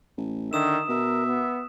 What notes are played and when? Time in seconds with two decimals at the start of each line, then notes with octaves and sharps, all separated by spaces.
0.17 A1
0.53 D3 D#3 E5 D#6 E7
0.89 B2 A#4 E5
1.28 B3